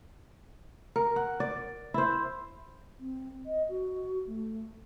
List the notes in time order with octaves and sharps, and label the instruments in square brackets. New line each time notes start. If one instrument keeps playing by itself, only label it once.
[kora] A#4
F#5
D5
E4 C5
[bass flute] C4
D#5
F#4
A3